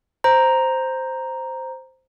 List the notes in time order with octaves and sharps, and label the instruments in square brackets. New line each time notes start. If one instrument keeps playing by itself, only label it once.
[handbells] C5 A#5